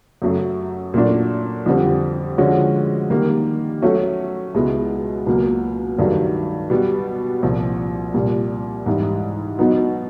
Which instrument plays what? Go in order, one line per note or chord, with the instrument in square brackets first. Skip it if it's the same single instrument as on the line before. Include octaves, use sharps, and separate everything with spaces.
[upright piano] F#2 C#3 F#3 A3
A#2 F#3 A3 D4 F#4
F2 D3 G3 C4
D3 F3 G#3 C#4 F#4
D#3 G3 A#3
F#3 A3 C#4 F#4 A4
C#2 B2 G#3 B3 E4
C#2 B2 F#3 A#3
G2 D#3 F#3 A3
B2 G3 B3
C2 A#2 F3
C2 A#2 G3
G#2 E3 G3
B2 F#3 B3 D#4